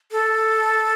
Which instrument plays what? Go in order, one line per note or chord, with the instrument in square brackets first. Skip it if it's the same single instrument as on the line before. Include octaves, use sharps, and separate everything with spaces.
[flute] A4